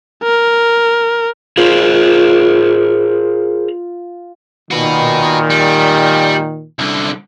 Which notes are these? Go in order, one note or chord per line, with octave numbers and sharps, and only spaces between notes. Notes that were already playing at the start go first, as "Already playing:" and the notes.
A#4
F4 G#4 A#4 C5
A#2 D#3 F#4 B4
G3
C2 D3